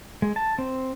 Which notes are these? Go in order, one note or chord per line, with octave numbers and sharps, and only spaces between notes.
G#3
A5
C4